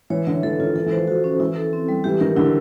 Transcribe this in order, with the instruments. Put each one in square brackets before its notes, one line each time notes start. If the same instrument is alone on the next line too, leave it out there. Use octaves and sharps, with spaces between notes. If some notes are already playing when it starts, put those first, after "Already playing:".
[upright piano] E3 [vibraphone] C#5
[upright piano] D3 [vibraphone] E5
[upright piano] E3 [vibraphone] A4
[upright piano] D#3 [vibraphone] F4
[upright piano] E3 [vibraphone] A4
[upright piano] E3
[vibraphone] C5
[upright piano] F3
[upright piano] E3 [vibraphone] F#4
[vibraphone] C#4
[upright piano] E3 [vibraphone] E4
[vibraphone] A4
C4
G3
[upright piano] E3 [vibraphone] G4
[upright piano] D#3 [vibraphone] A#4
[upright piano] D3 [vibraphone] E4